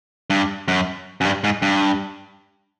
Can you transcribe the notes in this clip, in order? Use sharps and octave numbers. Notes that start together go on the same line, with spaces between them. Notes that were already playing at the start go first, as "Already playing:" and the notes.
G2
F#2
F#2
G2
G#2
G2